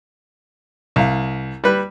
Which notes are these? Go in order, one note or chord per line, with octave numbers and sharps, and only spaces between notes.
C2 F5
G3 B4